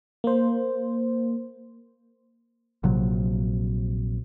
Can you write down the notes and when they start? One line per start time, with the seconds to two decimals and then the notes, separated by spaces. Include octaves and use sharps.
0.24 A#3 C5
2.84 A#1 C3 F#3